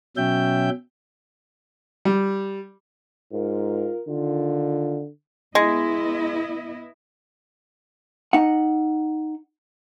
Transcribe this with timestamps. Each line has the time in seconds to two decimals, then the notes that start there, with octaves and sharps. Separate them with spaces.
0.17 B2 F#3 C#4 E5 G5 G6
2.05 G3
3.32 G#2 F4 A#4
4.09 D3 D#3 F4
5.55 G#3 B3 E4 D#5
8.33 D#4 F#5